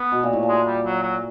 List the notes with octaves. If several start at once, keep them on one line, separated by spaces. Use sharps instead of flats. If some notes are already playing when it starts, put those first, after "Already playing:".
Already playing: B3
B2
A#2
A2
A#2
G#3
G3
F#3
F#3